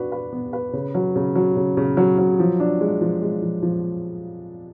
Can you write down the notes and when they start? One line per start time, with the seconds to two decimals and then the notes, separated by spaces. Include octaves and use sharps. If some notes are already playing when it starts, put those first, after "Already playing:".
Already playing: D4 F#4 B4
0.12 B4
0.33 B3
0.53 B4
0.73 C#3
0.95 F#3
1.16 C#3
1.35 F#3
1.56 C#3
1.77 C#3
1.97 F#3
2.18 F#3
2.39 F3
2.60 D4
2.81 G#3
3.01 F3
3.21 G#3
3.42 F3
3.62 F3